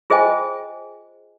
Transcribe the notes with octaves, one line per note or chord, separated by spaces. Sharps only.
F4 G#4 C5 D#5 G5 G#5